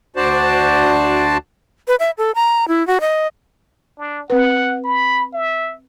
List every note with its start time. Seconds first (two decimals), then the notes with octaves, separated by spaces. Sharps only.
0.16 D2 D4 F#4 C5 D5 A5
1.88 B4
2.00 E5
2.18 A4
2.35 A#5
2.68 E4
2.87 F#4
3.01 D#5
3.98 D4
4.30 C4 B4 F#5
4.85 B5
5.33 E5